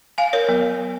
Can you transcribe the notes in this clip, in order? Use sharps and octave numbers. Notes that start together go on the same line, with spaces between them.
F5 G#5
A#4 C#5
F#3 B3